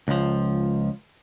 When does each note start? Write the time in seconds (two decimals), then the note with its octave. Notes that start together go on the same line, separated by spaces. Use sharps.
0.08 C#2 F3